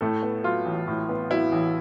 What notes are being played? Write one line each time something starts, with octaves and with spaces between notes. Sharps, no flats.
A2 A3 A4
B3
F#3 F4
A1
A2
B3
F#3 E4
A1